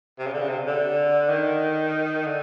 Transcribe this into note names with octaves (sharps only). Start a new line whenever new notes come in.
C3
C#3
D3
C#3
C3
D3
D#3
D3